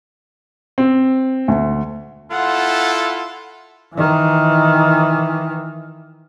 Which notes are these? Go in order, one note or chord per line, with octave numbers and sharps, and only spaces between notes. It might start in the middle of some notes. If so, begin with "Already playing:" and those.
C4
D2
E4 F4 A4 F#5
D#3 E3